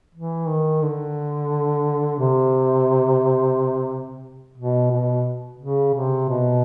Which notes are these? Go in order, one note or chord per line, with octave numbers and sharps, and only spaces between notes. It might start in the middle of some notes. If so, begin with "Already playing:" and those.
E3
D#3
D3
C3
B2
B2
C#3
C3
B2